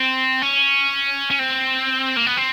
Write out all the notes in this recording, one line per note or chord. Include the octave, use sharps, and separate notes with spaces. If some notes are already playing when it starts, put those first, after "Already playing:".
Already playing: C4
C#4
C#4
C4
A#3
B3
C4